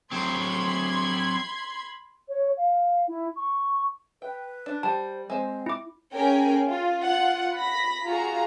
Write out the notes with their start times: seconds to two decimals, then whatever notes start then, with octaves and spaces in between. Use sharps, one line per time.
0.12 F#3 C4 B5 C6 G#6
2.28 C#5
2.57 F5
3.08 E4
3.37 C#6
4.22 B4 G5
4.66 D4
4.83 G3 C5 A5
5.30 G#3 C4 C5
5.66 E4 D6
6.13 A#3 C#4 G#4 A#4 G5 G#5
6.67 F4
7.04 F4 F#5
7.57 B5 A#6 B6
8.06 F4 F#4 G#4 A#5